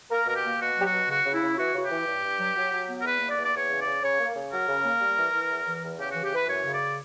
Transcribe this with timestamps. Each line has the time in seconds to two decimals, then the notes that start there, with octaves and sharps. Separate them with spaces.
0.11 A#3 A#4
0.27 B2 A#4
0.35 G4
0.44 A#3
0.60 B2 F#4
0.76 F#3 G4
0.84 F#4
0.93 B2
1.09 C#3 F#4
1.25 C#3
1.33 E4
1.42 C#3
1.57 E3 F#4
1.74 C#3 F#4
1.82 G4
1.90 E3
2.07 G2
2.23 G2
2.40 F#3
2.56 F#3
2.72 F#3
2.89 B3
2.99 A#4
3.05 E2 B4
3.21 A#3
3.29 D5
3.38 E2
3.43 D5
3.53 E2 C#5
3.70 C#3
3.79 D5
3.86 C#3
4.02 C#3 C#5
4.19 A#3
4.36 C#3
4.51 F#3 A#4
4.68 C#3
4.84 A#3
5.00 G3
5.17 E3
5.33 E3
5.49 E2
5.65 E3
5.82 E2
5.99 C#3 G4
6.10 E3 F#4
6.23 G4
6.32 E3 B4
6.48 F#2 C#5
6.64 C#3
6.72 D5